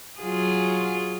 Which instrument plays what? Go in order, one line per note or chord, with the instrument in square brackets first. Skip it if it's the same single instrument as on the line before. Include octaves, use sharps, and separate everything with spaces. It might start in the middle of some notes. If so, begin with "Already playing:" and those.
[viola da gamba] F#3 F4 G#4